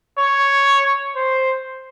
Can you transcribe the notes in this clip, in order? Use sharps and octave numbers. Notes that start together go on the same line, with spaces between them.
C#5
C5